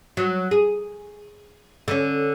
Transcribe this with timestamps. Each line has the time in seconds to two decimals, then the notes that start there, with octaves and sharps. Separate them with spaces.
0.17 F#3
0.51 G#4
1.88 D3 C#4